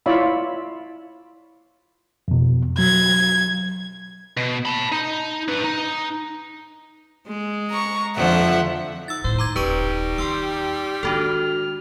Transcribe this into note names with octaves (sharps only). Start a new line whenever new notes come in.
E4 F4 C#5 D5 E5 B5
F2 B2
F#3 G#6
B2
A5 B5
D#4
D4 B4
D#4
G#3
A#5 C#6
F2 D3 F3 E5 F#5
D#4 E6 A6
D#2 A2 C5
A#5 D6 G#6
D#1 A#1 G3 B4 C#6 D#7
D#2 G5 C6 E6
D#3 G#3 D4 F#4 A4 F6